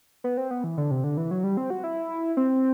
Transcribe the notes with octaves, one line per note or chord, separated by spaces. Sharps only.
B3
C4
B3
E3
D3
C3
D3
E3
F#3
G3
C4
F#4
E4
C4